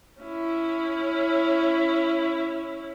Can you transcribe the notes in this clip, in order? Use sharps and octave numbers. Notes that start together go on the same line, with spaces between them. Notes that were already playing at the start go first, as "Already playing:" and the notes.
C#4 E4